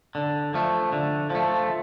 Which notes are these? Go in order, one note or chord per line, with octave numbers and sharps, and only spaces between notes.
D3
F3 A3
D3
F3 A3